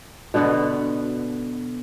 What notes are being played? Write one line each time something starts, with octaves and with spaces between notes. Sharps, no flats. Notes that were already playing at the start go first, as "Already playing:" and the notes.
B2 D3 B3 F#4